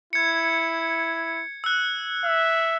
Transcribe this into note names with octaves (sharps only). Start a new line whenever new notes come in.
E4 G#6 C#7
E6 F#6
E5